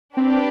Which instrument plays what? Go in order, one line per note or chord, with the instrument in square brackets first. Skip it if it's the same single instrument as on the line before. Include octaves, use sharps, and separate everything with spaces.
[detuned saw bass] C4 [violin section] D4 G4 B4 D5